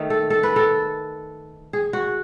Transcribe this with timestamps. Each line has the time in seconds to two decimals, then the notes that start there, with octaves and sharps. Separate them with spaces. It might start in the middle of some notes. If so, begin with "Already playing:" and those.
Already playing: D#3 A3 D#4
0.10 A4
0.30 A4
0.43 B4
0.56 A4
1.73 G#4
1.93 F#4